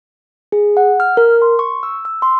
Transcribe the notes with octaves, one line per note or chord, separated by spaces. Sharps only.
G#4
F#5
F6
A#4
C6
C#6
E6
E6
C6